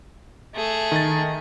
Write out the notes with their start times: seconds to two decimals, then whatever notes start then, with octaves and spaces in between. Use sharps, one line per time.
0.55 A3 G#4
0.92 D#3 A6